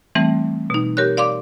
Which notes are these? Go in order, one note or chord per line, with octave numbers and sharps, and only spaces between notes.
E3 G3 A3 C4
B2 D#4
G4 A#4 C#5 F#6
D5 F5 C6 D6